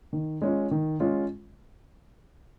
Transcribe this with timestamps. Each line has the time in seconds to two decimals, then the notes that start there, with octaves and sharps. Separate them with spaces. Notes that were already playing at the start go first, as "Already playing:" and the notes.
0.13 D#3
0.42 G#3 C#4 F4
0.71 D#3
1.00 G#3 C#4 F4